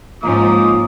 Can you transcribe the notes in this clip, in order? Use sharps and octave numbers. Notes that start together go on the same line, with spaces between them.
G#2 F3 A#3 C#4 D#4 F4 D6 D#6